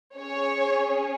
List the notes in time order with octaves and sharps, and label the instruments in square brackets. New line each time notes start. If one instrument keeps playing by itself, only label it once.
[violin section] C#4 G#4 C#5